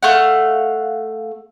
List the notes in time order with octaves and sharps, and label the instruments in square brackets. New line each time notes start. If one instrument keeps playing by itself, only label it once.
[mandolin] A3 F5 F#5